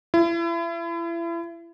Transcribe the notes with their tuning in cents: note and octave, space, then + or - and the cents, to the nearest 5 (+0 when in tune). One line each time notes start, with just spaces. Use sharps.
E4 +35